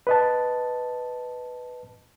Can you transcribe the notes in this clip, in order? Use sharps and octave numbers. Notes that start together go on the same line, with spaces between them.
B4 D#5 A5